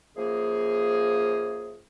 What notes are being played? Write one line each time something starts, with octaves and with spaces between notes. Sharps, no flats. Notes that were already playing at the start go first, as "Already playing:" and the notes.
F#2 F3 A#3 G#4